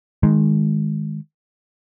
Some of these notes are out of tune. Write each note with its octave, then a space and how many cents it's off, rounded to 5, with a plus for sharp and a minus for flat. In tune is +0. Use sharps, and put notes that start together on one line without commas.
D#3 +0 G#3 +0